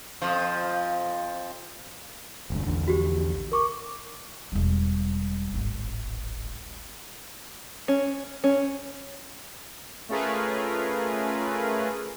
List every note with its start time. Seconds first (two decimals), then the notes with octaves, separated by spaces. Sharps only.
0.22 F2 F3
2.50 F1 D2 G2
2.67 A#1 E2 D3
2.88 F#4 G4
3.52 A#4 C#6 D6
4.52 E1 G3
5.54 D1 G#1
7.88 C#4
8.44 C#4
10.09 A3 C#4 F4 G#4 A#4 B4